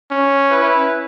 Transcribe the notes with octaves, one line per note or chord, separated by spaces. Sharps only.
C#4
E4 B4